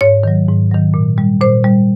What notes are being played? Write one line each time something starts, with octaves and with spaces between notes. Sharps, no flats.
G#2 C#5
D#3 F#3
G#2
D#3 F#3
A#2
G3
A#2 C5
G3